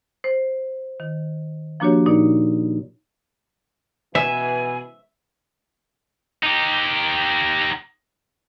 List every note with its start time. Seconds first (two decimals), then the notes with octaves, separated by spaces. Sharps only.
0.24 C5
1.00 D#3
1.80 F3 A#3 D4 F#4 G4 C#5
2.06 A#2 D#4 D5
4.15 B2 E3 E5 G#5
6.43 D#4 G4